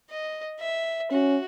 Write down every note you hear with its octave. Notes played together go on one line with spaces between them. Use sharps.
D#5
E5
C#4 F#4